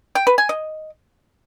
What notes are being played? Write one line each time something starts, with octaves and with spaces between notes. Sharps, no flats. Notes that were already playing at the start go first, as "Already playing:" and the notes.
G5
B4
G#5
D#5